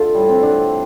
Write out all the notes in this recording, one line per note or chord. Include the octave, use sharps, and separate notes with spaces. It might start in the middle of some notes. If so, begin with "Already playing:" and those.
Already playing: D3 A3 F4 A4
A2 G3
C4
D3 A3 D4